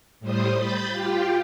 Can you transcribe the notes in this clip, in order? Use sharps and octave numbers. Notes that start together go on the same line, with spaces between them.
A2 G3 C5 D#6
B5 G6 A6
F4 G4 G5